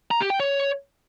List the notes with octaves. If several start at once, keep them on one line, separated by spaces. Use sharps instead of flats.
A#5
G4
G5
C#5